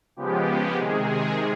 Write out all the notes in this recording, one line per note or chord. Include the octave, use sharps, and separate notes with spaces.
C#3 F3 G#3 B3 G4
G4
C3 D#3 G#3 G#4